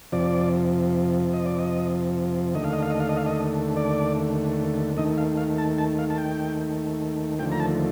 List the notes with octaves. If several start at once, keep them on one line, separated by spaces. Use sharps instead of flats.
F2 C3 F3 D5
D#5
D5
D#5
D#2 D3 A3 D#5
F5
D#5
F5
D#5
F5
D#5
F5
D#5
D5
D#2 D#3 A3 D#5
F5
F5
A5
A5
F5
A5
G5
D#2 D3 F3 A3 G5
A#5
A5